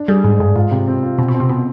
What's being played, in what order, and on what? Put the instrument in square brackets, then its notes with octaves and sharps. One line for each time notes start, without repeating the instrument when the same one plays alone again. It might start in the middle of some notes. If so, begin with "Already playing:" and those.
Already playing: [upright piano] D4
[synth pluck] G3 [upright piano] G#4
[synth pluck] G#2 [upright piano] G#3
[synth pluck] G2 [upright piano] G#4
[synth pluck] G#2 [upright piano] F4
[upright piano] C3
C4
F4
[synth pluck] B2 [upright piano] C4
[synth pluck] B2
[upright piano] C4
[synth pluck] C3
[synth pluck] B2 [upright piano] C4